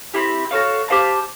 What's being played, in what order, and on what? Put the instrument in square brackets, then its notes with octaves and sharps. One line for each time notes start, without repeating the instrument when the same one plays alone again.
[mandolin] C4 E4 G4
F#4 A4 C#5 F5
G4 C5 F5 A5